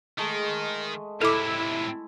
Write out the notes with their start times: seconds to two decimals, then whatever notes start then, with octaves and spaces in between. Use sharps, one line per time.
0.18 D#3 G#3 A3 D#5
1.22 A2 C3 E4 A4 D6